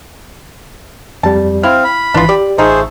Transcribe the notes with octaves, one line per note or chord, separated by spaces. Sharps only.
F2 G3 A5
C4 E4 F5 F6
B5
G#1 E3 D4 F4 C6
G4 D5
A1 F3 A3 D#4 G#4 C5